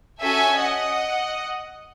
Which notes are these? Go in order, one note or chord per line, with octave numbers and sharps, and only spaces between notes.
C#4 F#4 A4 E5 G#5
D#5 F#5